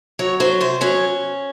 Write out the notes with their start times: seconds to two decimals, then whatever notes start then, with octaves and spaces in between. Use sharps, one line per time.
0.19 F#3 C#5
0.40 F#3 C5
0.60 C3 C5
0.81 F#3 C#4